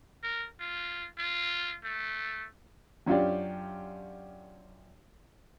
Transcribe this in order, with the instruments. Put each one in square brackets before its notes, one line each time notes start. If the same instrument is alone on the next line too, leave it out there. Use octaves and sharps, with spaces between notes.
[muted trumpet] A#4
F4
F4
A3
[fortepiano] F#2 C#4 D4 F4 G4 D5